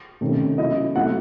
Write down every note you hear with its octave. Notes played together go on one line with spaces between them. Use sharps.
C3 D#3 A3 C#4
F#3 C#4 E4 D#5
F#3 A3 C4 E4 F#5